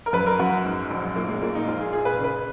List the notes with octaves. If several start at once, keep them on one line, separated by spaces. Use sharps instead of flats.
A#4
F#2 B4
A#4
F#2 F#4
G#2
A#1
A#2 A#3
G#3
A#2 A#3
D#4
A#1 F4
G#4
A#2 G#4
B4
C#3
B4